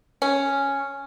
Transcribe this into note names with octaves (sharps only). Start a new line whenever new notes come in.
C#4